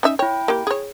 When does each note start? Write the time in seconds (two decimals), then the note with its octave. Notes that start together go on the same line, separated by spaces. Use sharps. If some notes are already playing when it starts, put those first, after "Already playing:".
0.03 C#4 D#4 E5
0.19 E4 C#5 G5
0.48 A#3 G4
0.67 G#4 C#5